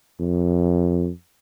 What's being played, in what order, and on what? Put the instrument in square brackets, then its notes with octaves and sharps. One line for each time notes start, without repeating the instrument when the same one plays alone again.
[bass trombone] F2